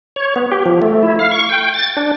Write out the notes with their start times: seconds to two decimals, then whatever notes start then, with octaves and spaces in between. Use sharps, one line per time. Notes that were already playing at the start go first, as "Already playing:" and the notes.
0.16 C#5
0.36 B3
0.52 G4
0.66 F3
0.82 A3
1.03 E4
1.19 F5
1.31 C#6
1.49 G5
1.74 A6
1.97 D4